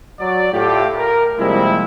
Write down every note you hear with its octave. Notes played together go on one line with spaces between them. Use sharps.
F#3 D5
A2 A3 F4 G4
A#4
C3 F3 G3 G#3 A#3 E4